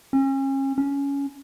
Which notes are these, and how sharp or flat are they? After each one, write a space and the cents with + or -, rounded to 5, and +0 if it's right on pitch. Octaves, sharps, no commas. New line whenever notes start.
C#4 -35
C#4 +15